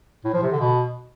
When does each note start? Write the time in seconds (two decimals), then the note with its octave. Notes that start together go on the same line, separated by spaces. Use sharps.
0.25 A2
0.34 F3
0.43 C3
0.52 D3
0.61 B2